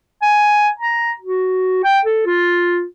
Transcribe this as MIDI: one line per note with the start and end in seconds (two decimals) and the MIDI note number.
0.22 0.69 80
0.80 1.12 82
1.21 1.80 66
1.84 2.00 79
2.05 2.24 69
2.26 2.84 65